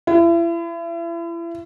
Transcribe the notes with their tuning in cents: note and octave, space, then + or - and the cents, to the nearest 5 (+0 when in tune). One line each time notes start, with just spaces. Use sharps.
E4 +35